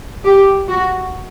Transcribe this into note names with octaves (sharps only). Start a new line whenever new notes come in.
G4
F#4